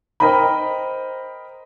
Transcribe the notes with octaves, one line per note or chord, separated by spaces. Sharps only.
A#4 C5 D#5 G5 A#5 B5